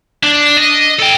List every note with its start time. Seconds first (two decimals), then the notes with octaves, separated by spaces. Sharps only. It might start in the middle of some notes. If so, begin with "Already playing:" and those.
0.23 D4
0.57 D#5
1.00 A4 G5